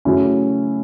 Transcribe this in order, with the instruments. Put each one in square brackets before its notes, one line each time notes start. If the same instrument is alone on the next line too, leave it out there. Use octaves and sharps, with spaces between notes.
[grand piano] C#3 F#3 A3 C#4 E4